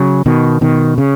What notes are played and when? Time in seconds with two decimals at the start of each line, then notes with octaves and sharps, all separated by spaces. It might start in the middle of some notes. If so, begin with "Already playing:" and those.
Already playing: C#3 F#3
0.26 B2 D#3
0.61 B2 D#3
0.98 C#3